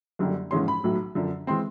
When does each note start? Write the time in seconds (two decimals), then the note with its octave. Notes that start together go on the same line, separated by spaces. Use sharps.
0.19 F#1 F#2 D3 G3
0.51 A#1 G#2 E3 G#3 C#4 C6
0.68 B5
0.84 B1 A2 F#3
1.15 F#2 D3 F3
1.47 E3 G#3 C4 C6